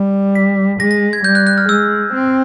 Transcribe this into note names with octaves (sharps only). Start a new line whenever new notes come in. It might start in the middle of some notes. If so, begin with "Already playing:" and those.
Already playing: G3
B6
G#3 A#6
A#6
G#6
G3 G6
F#6
F#6
F6
G#3 E6
C4